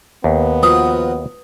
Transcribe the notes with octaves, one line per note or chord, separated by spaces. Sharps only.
D#2 B3
F3 F#4 B4 A#5 D#6